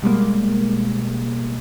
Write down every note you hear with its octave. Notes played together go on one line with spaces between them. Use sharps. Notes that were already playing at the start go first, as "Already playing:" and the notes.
B2 G3 G#3 A#3